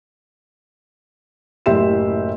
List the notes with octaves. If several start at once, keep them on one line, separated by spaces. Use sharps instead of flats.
F#1 A2 G4 E5 C6 E7